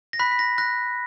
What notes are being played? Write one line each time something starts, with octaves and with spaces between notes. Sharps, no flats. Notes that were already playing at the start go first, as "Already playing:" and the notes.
A#6
B5 F#6 B6
B6
A#6
F#6 A#6